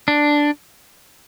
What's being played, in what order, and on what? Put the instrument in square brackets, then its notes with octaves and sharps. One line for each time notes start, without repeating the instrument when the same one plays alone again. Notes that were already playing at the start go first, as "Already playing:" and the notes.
[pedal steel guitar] D4